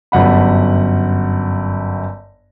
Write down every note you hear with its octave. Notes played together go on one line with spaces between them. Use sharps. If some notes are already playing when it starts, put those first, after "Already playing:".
G1 F#2 F#5 B5